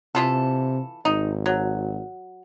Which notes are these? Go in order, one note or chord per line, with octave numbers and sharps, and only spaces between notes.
C3 E3 F4 A4
G#1 D#4
F#3